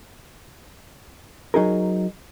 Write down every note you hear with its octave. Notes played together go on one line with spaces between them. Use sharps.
F#3 D#4 G#4 A#4